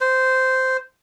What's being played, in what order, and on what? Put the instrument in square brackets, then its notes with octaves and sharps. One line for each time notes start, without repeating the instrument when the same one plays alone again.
[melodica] C5